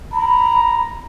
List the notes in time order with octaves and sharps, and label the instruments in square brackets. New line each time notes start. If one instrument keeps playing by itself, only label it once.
[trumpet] A#5 [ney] B5